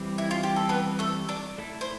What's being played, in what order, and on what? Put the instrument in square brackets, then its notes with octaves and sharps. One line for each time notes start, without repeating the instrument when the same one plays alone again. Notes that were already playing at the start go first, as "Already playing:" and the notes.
Already playing: [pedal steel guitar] E3 G3 C4
[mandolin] E4
F4
G4
A4
B3 B4
A3 A4
D4 D5
[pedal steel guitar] A3 E4 A4
[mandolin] C5